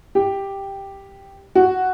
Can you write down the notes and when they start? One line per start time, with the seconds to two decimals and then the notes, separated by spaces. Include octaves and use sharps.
0.15 G4
1.55 F#4